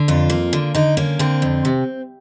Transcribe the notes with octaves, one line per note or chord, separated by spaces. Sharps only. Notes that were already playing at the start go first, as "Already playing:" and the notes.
Already playing: D3
F2 F4
A#3
D3
D3 D#4
A#3 C#4
D3 C4
F2
C3